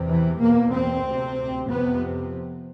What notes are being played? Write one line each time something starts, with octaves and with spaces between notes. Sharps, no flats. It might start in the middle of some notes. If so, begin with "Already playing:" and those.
Already playing: E2 C3
E3
E2 B2 A#3
C4
D2 C3
F2 C3 B3